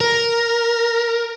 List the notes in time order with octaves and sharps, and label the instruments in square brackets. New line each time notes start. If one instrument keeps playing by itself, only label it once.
[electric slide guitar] A#4